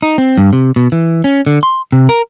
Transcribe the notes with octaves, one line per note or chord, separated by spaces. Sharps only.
D#4
C4
G2
C3
B2
E3
C#4
D3
C6
C3
A#4